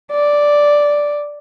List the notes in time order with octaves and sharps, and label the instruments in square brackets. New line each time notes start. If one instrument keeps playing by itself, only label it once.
[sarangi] D5